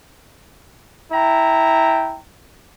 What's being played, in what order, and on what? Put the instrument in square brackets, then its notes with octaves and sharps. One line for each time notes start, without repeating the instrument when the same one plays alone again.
[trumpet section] E4 G5 A#5